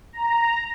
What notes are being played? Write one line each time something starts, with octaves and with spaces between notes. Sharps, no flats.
A#5